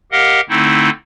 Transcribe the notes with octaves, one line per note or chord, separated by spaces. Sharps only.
G4 A#4 D#5 F5 F#5
D3 A3 C4 D#4 E4